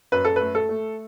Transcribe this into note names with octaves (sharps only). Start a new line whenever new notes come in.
F#2 B4
A4
A3 B4
A4
A3